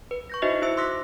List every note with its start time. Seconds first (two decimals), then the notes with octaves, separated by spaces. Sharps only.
0.11 B4
0.30 C#6 G6 A#6
0.42 D#4 E4 F#4 C5 D#5 E5
0.62 E4 C5 E5 E6
0.77 C6 D6 E6 F#6 A#6 B6